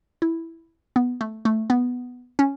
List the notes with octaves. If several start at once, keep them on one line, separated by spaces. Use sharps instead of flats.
E4
B3
A3
A3
B3
C#4